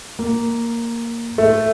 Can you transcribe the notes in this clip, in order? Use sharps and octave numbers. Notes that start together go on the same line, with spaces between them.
A#3
A3